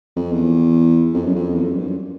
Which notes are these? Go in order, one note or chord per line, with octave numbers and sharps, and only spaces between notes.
F2
E2
F2
F#2
F2
E2
F2
F#2
G2
F#2